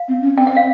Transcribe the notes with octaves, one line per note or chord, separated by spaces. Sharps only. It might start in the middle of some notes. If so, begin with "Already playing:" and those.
Already playing: F5
C4
C#4
C4 G5
F#5
F5